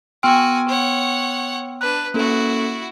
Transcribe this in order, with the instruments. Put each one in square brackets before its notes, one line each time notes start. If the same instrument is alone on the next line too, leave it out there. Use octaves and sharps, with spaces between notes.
[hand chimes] B3 C6 D7 [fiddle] F#4 G#5 [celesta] G5 E6 F6
[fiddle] C#5 F#5
[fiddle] D4 B4 [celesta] F#6
[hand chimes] A#3 C#4 A4 [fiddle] E4 F#4